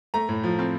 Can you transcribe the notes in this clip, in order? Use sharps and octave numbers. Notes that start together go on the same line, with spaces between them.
A3 A#5
A2
F3
C4